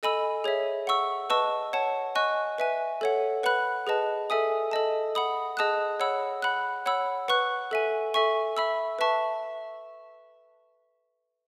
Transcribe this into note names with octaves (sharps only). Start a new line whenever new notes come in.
A4 D#5 G#5 B5 E6
G#4 C#5 E5
F#5 C#6 E6
B4 D#5 A5 C#6 E6
C#5 F#5 A5
D#5 G#5 C#6 F#6
B4 E5 G#5
A4 C#5 F#5
B4 F#5 B5 F#6
G#4 B4 D#5 A5
A4 E5 G#5 D#6
A4 D#5 A5
F#5 B5 D#6
G#4 D#5 A5 D#6 F#6
C#5 F#5 B5 E6
F#5 B5 F#6
C#5 F#5 B5 E6
B4 F#5 C#6 F#6
A4 E5 G#5
A4 E5 G#5 C#6
E5 B5 E6
B4 E5 A5 C#6